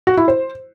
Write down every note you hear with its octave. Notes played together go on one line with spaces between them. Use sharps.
F#4
E4
C5